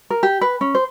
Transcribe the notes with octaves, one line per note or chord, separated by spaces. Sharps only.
A#4
G4
B4
C#4
C5